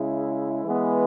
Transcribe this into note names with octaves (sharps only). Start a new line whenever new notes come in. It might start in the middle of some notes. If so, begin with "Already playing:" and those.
Already playing: C#3 G#3 E4
E3 G#3 B3